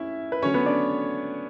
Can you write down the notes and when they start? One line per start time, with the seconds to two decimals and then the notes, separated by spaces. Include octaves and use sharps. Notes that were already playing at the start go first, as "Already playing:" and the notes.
Already playing: A3 C#4 E4 E5
0.32 B4
0.42 D3 F#3 A3 C#4 C#5
0.54 B3 B4
0.66 D4 D5